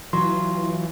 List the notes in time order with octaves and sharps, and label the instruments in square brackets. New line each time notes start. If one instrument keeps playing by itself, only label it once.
[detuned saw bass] E3 [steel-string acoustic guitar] F#3 F4 [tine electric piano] C6